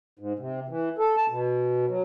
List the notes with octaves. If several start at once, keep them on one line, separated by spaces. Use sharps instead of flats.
G#2
C3
E3
A4
A5
B2
F#3